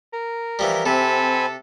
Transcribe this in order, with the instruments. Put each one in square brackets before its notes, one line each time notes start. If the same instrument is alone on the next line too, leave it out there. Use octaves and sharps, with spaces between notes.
[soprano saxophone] A#4
[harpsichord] E3 F3 G3
[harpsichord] C3 [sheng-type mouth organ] C4 G#5 B5 [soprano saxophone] A4